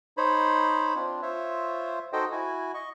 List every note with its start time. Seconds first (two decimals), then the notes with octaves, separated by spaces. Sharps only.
0.17 D#4 C5 C#5 B5
0.96 C4 D4 F4
1.22 F4 C5 C#5 E5
2.13 D#4 F#4 A4 C5 D#5 G5
2.32 E4 F#4 G#5
2.74 D#5 C#6